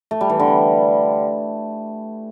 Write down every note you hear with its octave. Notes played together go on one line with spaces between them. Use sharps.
A3
G3
E3
D3